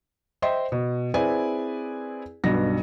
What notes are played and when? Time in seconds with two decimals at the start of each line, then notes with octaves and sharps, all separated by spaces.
0.42 C5 D#5 E5 G5 C6
0.72 B2
1.14 C4 E4 G#4 B4 D5 G#5
2.44 B1 G2 B2 A#6